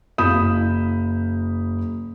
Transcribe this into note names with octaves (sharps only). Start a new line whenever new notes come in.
F#1 F5 B5 D#6 G6 E7